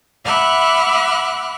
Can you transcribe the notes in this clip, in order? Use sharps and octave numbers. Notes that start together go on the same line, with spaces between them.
E5 F#5 B5 D6 F6 F#6